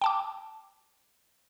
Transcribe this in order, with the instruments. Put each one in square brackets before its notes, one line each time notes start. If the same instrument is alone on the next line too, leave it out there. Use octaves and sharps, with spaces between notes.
[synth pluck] G5 A5 D6